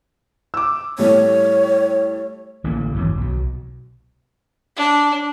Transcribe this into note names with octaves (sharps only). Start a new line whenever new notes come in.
D6 E6
A2 G3 A3 C#5
A1 D3 A#3
G#1 E2 G2 F#3
B1 B2
D4